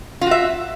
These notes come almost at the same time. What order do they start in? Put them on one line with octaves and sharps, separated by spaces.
F4 F#4 E5